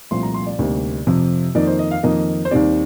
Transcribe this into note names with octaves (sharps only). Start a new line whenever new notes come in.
C2 A#2 F3 A3 C4 C6
A#5
C6
D5
D2 C3 G3 A#3 D#4
F2 C3 F3
F2 D#3 A#3 D#4 D5
C5
D#5
F5
F2 D#3 A#3 D#5
C5
D#2 D#3 G3 C4 D5